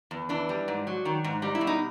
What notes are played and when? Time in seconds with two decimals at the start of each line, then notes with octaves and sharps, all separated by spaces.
0.11 E2
0.29 E3 D4
0.49 G3
0.68 G#2
0.87 F#3
1.05 D#3
1.24 G#2
1.42 G3 D#4
1.55 E4
1.61 B2
1.67 D#4